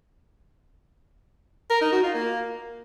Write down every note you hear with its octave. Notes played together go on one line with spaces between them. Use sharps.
A#4
D#4
F#4
F4
A#3